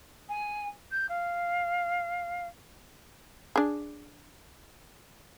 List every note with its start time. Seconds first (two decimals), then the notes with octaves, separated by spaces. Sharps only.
0.29 G#5
0.91 G6
1.09 F5
3.56 D4 G#4